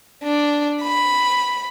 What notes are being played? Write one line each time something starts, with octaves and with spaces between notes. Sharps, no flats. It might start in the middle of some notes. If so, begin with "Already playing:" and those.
D4
B5